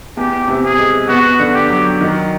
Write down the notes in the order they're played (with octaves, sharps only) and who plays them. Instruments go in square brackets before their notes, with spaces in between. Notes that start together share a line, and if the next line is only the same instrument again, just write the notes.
[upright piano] E2 [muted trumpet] G4
[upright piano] C3
[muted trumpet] G#4
[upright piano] G#3
[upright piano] B3 [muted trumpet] F#4
[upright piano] D3
[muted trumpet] G4
[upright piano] F#3
D#3